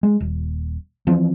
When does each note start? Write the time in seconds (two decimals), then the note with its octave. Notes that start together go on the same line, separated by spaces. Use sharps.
0.03 G#3
0.20 D#1
1.07 E3 F3 C4